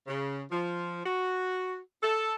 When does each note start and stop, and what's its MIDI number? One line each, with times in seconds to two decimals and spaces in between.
0.07 0.41 49
0.49 1.01 53
1.04 1.76 66
2.02 2.35 69